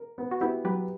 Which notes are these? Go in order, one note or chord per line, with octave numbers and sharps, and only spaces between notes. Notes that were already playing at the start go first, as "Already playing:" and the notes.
Already playing: A#4
B3
F#4
B3 E4 G4
F#3 G4 B4